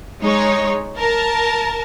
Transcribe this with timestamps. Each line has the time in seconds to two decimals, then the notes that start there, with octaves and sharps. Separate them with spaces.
0.22 G#3 D#4 C#5
0.97 A#4 A5